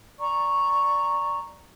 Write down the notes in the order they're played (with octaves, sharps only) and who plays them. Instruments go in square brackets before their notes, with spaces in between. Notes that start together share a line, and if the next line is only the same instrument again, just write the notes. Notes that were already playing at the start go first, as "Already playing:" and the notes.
[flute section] D5 A#5 C#6